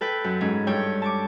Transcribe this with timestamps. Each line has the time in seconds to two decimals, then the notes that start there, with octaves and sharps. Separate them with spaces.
0.01 A4 B4 G5
0.24 F#2
0.41 G#2 C#4
0.67 G2 A4 C#5 G5
0.83 G4
1.02 A5 C#6 D6